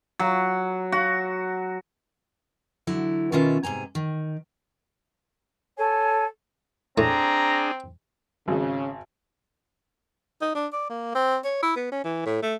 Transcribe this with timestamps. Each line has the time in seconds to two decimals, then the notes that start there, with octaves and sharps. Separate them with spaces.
0.19 F#3
0.92 F#4
2.87 D3 F#3 E4
3.32 B2 D#3 C#4 F4 E5
3.63 G#2 C3 G#5 A#5
3.95 D#3
5.77 A4 C#5 G#5
6.98 A2 C4 D4 G#4 A#5
8.48 G#1 C#3
10.42 D#4
10.55 D4
10.72 D5
10.90 A#3
11.14 C4
11.44 C#5
11.63 E4
11.76 B3
11.91 C#4
12.04 E3
12.26 A2
12.42 A3